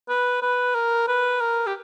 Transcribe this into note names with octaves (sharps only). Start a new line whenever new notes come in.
B4
B4
A#4
B4
A#4
G4